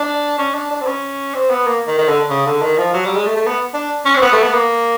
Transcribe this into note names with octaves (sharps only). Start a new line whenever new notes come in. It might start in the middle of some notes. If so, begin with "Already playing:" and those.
Already playing: D4
C#4
D4
D4
C4
C#4
C4
B3
A#3
D#3
D#3
D3
C#3
D3
D#3
F3
F#3
G3
G#3
A3
A3
B3
D4
C#4
C4
B3
A3
B3
A#3